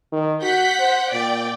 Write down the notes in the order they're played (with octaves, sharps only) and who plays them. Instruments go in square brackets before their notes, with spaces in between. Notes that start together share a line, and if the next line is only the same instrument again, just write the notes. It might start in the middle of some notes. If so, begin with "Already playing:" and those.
[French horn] D#3
[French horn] F#4 [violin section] F#5 G6 B6
[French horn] C5
[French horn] A#2 [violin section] D5 G5